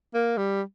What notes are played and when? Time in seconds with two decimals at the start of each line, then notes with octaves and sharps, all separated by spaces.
0.14 A#3
0.38 G3